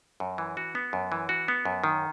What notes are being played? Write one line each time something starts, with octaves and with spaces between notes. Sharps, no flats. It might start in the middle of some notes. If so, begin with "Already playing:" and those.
F#2
E3
F#4
B3
F#2
E3
F#4
B3
F#2
D#3